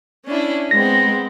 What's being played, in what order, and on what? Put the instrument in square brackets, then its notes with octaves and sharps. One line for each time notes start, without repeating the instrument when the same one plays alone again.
[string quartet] C#4 D4 E4
[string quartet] G#3 B3 C4 [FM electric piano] A#6